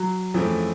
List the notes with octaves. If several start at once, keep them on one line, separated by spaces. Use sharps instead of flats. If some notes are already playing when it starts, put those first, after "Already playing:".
Already playing: F#3
F2 C#3 E3 F3 A3